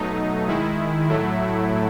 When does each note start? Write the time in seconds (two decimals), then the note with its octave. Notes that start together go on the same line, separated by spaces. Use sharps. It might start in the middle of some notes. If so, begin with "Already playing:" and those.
Already playing: B2 F#3 A3 D#4
0.48 D#3 G#3 E4
1.08 A2 F#3 A3